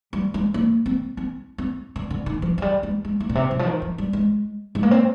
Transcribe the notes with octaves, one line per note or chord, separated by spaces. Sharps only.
G3
G#3
A#3
C4
C4
C4
D3
D3
D#3
F3
F3
G3
G#3
G#3
A#3
A#2
C3
D3
F3
D#3
F3
G3
G#3
G#3
A#3
C4